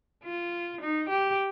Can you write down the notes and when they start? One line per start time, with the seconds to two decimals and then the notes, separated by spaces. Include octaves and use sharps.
0.24 F4
0.81 D#4
1.09 G4